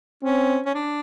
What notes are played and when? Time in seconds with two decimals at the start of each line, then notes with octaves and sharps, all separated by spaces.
0.23 C4 C#4
0.66 C#4
0.75 D4